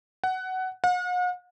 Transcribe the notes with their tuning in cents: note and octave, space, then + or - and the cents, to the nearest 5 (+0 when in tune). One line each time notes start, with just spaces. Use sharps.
F#5 +15
F#5 -45